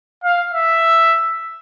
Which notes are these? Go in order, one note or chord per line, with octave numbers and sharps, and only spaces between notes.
F5
E5